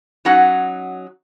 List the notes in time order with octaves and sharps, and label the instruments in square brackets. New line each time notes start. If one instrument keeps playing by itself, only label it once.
[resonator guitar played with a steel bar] F#3 C#4 D#4 F#4 F#5